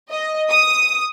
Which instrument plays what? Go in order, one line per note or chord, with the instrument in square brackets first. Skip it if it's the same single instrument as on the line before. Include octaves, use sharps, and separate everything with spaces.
[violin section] D#5
D#6